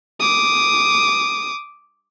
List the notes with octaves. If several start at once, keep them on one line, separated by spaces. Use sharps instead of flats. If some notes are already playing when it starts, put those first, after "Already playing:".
D6 D#6